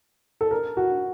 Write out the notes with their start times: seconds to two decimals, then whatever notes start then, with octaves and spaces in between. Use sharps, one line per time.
0.41 A4
0.51 A#4
0.77 F#4